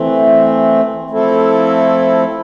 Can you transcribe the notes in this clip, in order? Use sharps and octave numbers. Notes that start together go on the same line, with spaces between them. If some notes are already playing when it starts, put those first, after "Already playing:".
Already playing: E3 A3 C4
F3 A3 C4 E4 A4